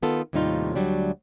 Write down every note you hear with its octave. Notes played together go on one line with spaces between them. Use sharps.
D#3 B3 F4 A4
D#2 A2 C3 G3 D#4 F4
D2 F#3 G3 D4